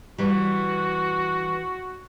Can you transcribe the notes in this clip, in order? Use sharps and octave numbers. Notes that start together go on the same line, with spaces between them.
E3 G3 F#4